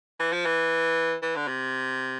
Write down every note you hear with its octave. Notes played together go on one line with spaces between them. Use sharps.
E3
F3
E3
E3
D3
C3